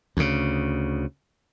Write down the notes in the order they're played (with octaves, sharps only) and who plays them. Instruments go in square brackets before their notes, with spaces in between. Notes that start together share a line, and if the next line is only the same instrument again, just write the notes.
[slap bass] D2 C#3